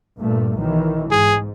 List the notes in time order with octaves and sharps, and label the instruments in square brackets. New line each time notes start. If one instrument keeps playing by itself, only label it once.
[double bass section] G2 A#2 A3
B1 D#3 E3
[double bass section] G#2 [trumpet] G#4